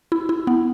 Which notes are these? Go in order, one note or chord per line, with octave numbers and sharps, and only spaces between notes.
E4
E4
B3